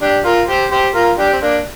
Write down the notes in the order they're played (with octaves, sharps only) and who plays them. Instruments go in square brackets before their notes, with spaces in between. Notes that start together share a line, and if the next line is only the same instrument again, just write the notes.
[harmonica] D4 G4
F4 A#4
G4 C5
G4 C5
F4 A#4
D4 G4
C4
A#3 D4